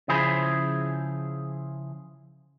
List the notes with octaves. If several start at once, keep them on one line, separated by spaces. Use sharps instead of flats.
C#3 F3 E4 G#4 C5 B5